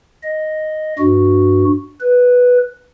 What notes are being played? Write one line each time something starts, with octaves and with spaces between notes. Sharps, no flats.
D#5
G2 F#4
B4